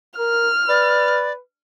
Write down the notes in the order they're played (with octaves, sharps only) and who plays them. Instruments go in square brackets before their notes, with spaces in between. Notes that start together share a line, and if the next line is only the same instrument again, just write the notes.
[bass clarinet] A#4 [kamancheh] F6
[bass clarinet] B4 [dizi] D5